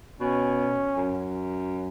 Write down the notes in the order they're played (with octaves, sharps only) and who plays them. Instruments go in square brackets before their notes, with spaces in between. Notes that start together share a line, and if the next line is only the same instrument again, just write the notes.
[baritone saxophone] B2 [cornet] C#4
[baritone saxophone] F#2